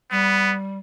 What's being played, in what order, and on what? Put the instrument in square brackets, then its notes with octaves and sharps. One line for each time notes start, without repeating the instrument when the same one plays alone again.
[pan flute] G3 [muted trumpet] B3